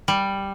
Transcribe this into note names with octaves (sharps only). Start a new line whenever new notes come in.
G3